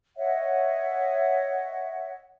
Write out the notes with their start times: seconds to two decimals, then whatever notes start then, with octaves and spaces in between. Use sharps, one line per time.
0.16 C#5 D#5 E5 F#5